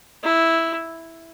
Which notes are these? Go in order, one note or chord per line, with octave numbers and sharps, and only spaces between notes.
E4